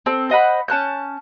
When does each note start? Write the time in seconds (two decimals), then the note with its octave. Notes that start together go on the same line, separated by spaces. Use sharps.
0.06 C4 A4
0.30 C5 D#5 F#5 B5
0.68 C#4 A5 F#6 G6